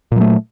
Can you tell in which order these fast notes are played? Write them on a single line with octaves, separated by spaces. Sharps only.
A#2 F#3 A3